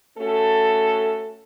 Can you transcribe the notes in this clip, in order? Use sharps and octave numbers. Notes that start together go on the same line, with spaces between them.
A3 C#4 F#4 A4